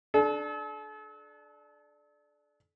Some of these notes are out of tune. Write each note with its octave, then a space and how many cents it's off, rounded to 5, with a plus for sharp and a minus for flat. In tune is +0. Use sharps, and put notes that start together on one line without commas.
D4 +10 A4 -40